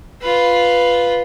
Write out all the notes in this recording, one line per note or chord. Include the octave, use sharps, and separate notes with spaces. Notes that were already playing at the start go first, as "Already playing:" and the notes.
F4 B4